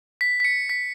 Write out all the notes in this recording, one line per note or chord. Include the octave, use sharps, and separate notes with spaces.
B6
B6
C#7
B6